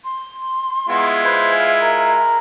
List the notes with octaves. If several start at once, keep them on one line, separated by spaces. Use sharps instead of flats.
C6
G#3 B3 E4 F4
B4 C5 E5 G#5
F5
A#4